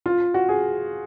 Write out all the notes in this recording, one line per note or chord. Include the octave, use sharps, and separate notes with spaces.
F4
F#4
G#4